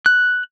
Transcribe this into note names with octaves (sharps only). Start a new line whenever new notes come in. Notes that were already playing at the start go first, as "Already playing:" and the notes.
F#6